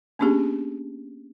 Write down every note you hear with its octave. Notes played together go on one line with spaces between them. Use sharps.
A#3 B3 C#4 D4 G4 G#4